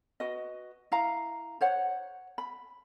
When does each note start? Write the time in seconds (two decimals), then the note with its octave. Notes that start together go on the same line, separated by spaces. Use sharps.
0.20 F#4 B4 D#5
0.92 E4 F5 A#5
1.61 C5 C#5 F#5
2.38 B5